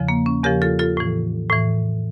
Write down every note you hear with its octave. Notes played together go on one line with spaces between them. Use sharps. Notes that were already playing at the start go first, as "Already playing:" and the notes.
Already playing: E2 C#3 F3
A#3
C#4
E2 C#3 F3 G4 A#4
F4 A4
F4 A4
A2 E3
A2 E3